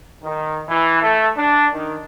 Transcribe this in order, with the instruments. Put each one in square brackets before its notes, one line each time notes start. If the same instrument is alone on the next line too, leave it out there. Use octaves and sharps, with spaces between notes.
[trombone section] D#3
E3
A3
D4
D#3